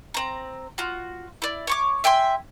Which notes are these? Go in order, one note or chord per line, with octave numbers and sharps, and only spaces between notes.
C4 A#5
F4 F#4
E4 D5
C#5 C#6 D6
E5 G5 G#5 C6